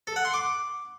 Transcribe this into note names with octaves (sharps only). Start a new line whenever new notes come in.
A4
F#5
C6
D6